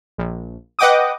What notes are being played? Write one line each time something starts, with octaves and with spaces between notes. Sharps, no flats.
A#1
B4 D#5 F#5 G5 D6 D#6